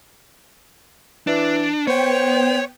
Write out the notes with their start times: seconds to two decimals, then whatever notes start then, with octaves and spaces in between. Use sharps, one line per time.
1.27 E3 D4
1.87 B3 C5 C#5 G5